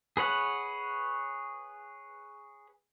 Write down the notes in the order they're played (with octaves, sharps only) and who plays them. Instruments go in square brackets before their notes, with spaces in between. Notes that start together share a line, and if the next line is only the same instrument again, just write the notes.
[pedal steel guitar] G#4 B4 C#5 F#5